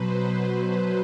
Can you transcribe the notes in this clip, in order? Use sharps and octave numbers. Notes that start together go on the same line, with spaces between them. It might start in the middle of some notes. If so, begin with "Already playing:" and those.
Already playing: B2 F#3 B4 C5